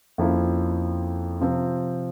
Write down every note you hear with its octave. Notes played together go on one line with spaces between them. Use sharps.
F2 C#3 F3 A#3 E4
C3 F3 C4